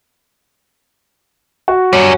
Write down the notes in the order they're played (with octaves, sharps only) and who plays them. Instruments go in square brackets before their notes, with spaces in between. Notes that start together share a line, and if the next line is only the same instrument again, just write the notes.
[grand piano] F#4
[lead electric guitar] F#2 G3 [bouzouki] C#4